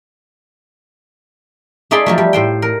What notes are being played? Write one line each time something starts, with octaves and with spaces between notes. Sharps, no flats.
A3 D#4 G#4 D5 B5 C6
F3 F#3 A3
G3
A2 C5 G5
A#4